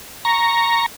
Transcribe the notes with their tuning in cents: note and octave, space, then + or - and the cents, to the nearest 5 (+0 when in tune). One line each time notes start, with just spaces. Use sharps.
A#5 +0 C#6 +0